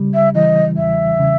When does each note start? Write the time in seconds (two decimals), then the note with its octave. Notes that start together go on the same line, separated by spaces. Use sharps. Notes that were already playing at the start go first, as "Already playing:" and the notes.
Already playing: C#3 G3
0.14 E5
0.35 E3 D#5
0.77 E2 E5
1.20 C#3